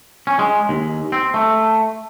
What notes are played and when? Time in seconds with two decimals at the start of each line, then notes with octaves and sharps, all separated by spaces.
0.27 C#4
0.39 G#3
0.69 D#2
1.12 C4
1.34 A3